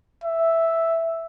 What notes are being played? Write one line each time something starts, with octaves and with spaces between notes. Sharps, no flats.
E5